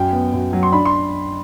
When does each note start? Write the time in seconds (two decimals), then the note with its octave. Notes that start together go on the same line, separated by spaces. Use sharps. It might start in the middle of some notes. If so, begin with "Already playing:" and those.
Already playing: F#2 G5
0.13 B3
0.33 F#2
0.53 F#3
0.63 C6
0.72 D4 B5
0.85 C6